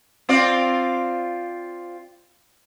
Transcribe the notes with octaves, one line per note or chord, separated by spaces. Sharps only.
C4 F4 D5